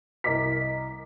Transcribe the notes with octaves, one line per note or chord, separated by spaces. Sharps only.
C2 A#4 D#5 D6 B6